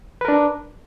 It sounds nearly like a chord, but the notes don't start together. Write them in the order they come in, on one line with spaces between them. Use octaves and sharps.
B4 A#4 D4